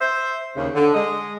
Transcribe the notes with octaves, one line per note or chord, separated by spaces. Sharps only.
C5 E5
D#2 C#3
D3
G#3 D#5